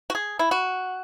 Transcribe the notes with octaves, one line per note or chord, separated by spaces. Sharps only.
F#4
G#4
E4
F#4